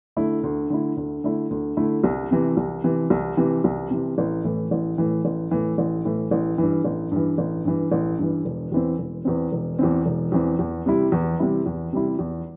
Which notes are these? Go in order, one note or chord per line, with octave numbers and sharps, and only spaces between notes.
D3 A3 E4
D2
D3 A3 E4
D2
D3 A3 E4
D2
D3 A3 E4
C2
C3 E3
C2
C3 E3
C2
C3 E3
C2
C3 E3
A1
A2 E3
A1
A2 E3
A1
A2 E3
A1
A2 E3
A1
G2 E3
A1
G2 E3
A1
G2 E3
A1
G2 E3
E1
E2 E3 C4
E1
E2 E3 C4
E1
E2 E3 C4
E1
E2 E3 C4
E2
C3 G3 E4
E2
C3 G3 E4
E2
C3 G3 E4
E2